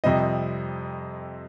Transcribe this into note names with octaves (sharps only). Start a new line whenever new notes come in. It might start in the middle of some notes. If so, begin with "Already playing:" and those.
F2 C3 G3 C4 D#5